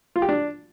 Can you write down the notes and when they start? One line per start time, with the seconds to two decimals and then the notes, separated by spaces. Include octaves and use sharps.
0.16 F4
0.22 G4
0.29 D4